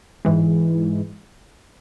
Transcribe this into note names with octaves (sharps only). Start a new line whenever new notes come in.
G#2 E3 G#3